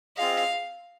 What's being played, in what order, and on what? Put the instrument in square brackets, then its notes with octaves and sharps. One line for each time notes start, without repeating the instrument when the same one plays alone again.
[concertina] C4 F4 G#4 D#5 [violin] F5